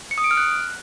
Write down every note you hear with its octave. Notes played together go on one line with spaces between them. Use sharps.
C#7
D#6
D7
F6
F#6